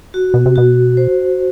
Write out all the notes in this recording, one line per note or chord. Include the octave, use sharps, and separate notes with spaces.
F#4
B2
C3
B2 F#4
C5